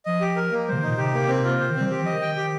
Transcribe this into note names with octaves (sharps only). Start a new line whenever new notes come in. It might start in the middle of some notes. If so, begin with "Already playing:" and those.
F3 D#5
G4
A#4
A#3
C3 G3 C5
D#3
A#2 D#4
C3 G4
A#3
C4
F4
C3 C5
D#3
G3 C4
D#3 G4
F3
D#5
D#3
G5
G4